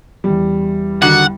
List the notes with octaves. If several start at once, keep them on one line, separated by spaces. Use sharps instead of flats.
E2 G3
D3 D#3 F#4 F#5